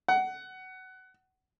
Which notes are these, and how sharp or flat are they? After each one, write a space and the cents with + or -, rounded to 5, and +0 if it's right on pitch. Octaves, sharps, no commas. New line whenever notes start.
F#5 +20